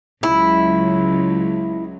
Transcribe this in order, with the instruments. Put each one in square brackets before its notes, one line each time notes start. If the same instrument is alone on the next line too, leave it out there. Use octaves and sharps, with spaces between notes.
[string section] C#2 F#3 [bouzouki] E4